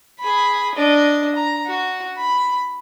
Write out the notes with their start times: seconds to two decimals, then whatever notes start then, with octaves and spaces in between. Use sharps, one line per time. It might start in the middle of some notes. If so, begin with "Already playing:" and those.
0.20 G#4 B5
0.75 D4 D#5
1.36 A#5
1.67 F#4
2.17 B5